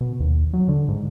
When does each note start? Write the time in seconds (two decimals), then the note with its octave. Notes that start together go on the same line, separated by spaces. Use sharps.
0.01 B2
0.20 D#2
0.53 F#3
0.68 D3
0.89 G#2